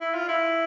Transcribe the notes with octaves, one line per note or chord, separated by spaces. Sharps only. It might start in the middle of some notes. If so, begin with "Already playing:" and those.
E4
F4
E4